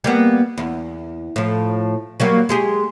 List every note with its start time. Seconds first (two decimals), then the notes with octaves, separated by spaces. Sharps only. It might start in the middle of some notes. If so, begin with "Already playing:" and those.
0.04 G3 A#3 B3
0.58 E2
1.36 A2 F3
2.20 F#3 G3 A#3
2.49 G#3 G4 G#4